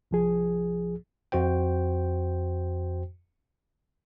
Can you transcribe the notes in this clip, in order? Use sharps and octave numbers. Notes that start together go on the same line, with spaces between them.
C2 F3 G#4
F2 F#4 C5 G5